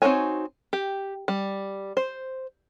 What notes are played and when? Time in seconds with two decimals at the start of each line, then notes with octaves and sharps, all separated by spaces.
0.02 C4 D#4 F#4 C#5 G#5
0.73 G4
1.28 G3
1.97 C5